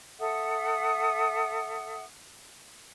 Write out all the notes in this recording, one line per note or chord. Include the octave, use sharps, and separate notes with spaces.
A4 E5 F#5 D#6